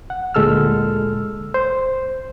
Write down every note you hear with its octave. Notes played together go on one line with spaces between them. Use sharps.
F#5
D2 A#2 G#3 A4 E6 F6
C5